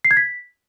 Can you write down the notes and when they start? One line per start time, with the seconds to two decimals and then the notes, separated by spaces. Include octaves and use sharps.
0.05 C7
0.11 G#6
0.17 B6